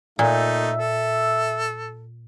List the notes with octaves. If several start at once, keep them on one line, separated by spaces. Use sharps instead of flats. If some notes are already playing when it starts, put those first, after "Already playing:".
A#2 A3 D#4 E5
A4